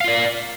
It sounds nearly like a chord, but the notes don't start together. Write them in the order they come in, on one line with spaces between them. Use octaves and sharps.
F5 F4 D5